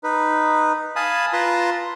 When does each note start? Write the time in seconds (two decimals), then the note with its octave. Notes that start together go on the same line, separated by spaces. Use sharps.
0.04 D#4 B4
0.96 F5 G#5 A5 B5 D#6
1.33 F4 B4 A5 A#5 C6